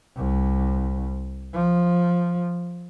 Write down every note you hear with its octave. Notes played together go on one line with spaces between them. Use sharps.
C2
F3